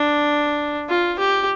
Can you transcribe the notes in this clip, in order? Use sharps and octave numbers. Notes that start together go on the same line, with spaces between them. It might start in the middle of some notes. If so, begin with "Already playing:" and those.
Already playing: D4
F4
G4